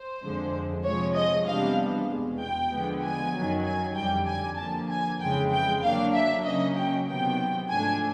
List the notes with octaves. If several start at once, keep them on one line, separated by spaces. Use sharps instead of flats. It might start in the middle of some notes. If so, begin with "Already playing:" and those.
Already playing: C5
F2 D3 F3 G#3
C3 F3 G#3 C#5
D#5
C3 E3 G3 B3 D4 F5
E2 B2 G#3
G5
D3 F3 G#3 B3
G#5
F#2 D#3 F#3
G#5
F2 D3 G3 G5
G#5
D3 F3 A#3 A5
G#5
F2 C#3 E3 G#3 G5
G5
D3 F#3 A#3 D4 F5
E5
C#3 F#3 A#3 C#4 D#5
G5
C3 D#3 F#3 B3 G5
G#2 F3 A3 D4 G#5